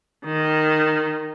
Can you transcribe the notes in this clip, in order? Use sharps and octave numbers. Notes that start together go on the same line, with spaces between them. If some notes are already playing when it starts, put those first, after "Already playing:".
D#3